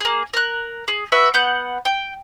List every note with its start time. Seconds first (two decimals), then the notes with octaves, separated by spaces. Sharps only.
0.01 A#3 G#4
0.34 A#4 F#6
0.88 G#4
1.12 F#4 B4 E5
1.34 B3 F#5 G6
1.85 G5